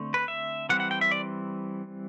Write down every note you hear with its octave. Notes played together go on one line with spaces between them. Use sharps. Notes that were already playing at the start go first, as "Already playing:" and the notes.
Already playing: D3 A3 C4
B4
E5
E3 G3 C4 F#5
F#5
G5
E5
D5